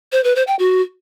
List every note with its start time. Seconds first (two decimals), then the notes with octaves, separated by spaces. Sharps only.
0.12 C5
0.24 B4
0.36 C5
0.47 G5
0.59 F#4